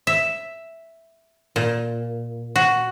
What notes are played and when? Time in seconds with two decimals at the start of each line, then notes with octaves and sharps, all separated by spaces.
0.07 E5
1.56 A#2
2.56 F#4